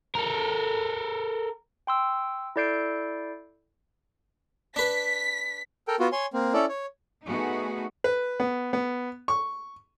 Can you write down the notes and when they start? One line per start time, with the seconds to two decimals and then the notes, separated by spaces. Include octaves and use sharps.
0.15 A4 A#4
1.87 G5 C6 E6
2.56 E4 A4 D5 G6 C7 D7
4.76 D4 B4 B6
5.88 A4 A#4 G5
5.99 B3 F4 F#4
6.12 C#5 G#5 C6
6.33 A#3 C4
6.53 C#4 E4 A4 D5
6.69 C#5
7.27 A3 B3 D#4 F#4 G#4
8.04 B4
8.40 B3
8.73 B3
9.28 C#6